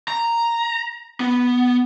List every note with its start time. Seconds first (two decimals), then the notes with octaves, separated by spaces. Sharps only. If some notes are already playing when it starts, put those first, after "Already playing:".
0.08 A#5
1.20 B3